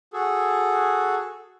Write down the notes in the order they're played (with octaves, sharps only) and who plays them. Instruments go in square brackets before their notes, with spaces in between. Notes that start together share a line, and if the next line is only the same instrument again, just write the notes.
[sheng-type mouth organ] F#4 G#4 A4